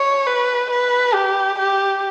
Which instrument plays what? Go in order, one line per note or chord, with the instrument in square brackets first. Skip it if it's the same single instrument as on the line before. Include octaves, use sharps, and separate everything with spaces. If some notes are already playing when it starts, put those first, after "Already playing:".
Already playing: [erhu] C#5
B4
B4
G4
G4